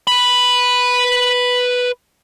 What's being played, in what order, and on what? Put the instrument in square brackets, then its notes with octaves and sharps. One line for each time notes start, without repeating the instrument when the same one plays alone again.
[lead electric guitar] B4 B5